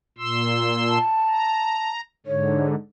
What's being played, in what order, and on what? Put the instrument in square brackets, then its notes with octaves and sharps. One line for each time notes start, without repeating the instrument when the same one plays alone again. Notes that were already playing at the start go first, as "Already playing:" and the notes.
[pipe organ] A#2 C6 E6
[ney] A5
[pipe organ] A#5
[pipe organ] G#2 D3 [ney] C#5